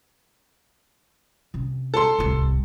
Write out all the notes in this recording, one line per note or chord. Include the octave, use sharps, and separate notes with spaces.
C3 C#4
A4 C6
D1 C2